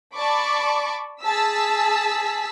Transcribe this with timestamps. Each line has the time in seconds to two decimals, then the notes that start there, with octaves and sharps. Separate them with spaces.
0.15 D5 A5 B5 C#6 D6
1.23 G#4 A5 E6 B6